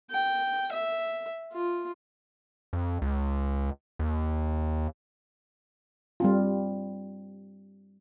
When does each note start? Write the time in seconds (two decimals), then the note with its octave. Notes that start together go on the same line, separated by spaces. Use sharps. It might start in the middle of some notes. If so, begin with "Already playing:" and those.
0.10 G5
0.72 E5
1.53 F4
2.73 F2
3.02 C#2
3.99 D#2
6.20 G3 C4 F4